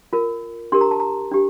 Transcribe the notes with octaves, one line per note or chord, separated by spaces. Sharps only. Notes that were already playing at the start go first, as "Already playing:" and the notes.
F4 A#4
D4 G4 A#4 C6
A#5
A5
A#5
D4 G4